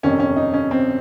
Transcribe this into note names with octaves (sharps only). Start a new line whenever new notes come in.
G1 F2 C3 D#3 C#4
C#4
D#4
C#4
C4